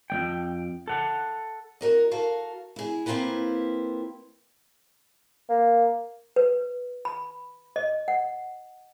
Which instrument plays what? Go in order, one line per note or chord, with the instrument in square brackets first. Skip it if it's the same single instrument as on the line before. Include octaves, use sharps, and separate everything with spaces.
[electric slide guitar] F2 G#3 G5
A4 F#5
[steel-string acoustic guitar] F#4 A#4 D#5
F#4 A4 A#4 F5
E4 G#4
A#3 C4 E4 F4 G4 B4
[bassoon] A#3
[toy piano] B4
B5
D#5
F#5